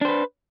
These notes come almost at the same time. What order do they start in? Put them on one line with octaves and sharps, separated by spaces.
D4 C5 B4